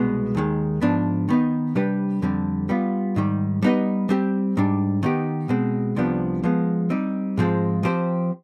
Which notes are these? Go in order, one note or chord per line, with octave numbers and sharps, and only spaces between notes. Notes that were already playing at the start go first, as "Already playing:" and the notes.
Already playing: C2 B2 G#3 B3
D#2 D#3 G#3
G#2 F3 B3 D4
D#3 B3 D#4
C3 G3 D4 G4 B4
F2 D3 G3 C4
G3 B3 F4
G#2 D#3 G3
G3 B3 D#4 B4 D#5
G3 C4 G4
G#2 G3 D4
D#3 B3 D#4 G4
B2 G#3 C4
C2 C3 F3 B3 D4
F3 G#3 B3
G3 C4 D#4
G#2 F3 G#3 C4 F4
F3 C4 G4 C5